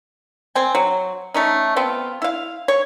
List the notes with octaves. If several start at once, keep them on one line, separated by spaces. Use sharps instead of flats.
C4 G#5
F#3
A3 C#4 D#4
B3 C4 F4
E4 F5
C#5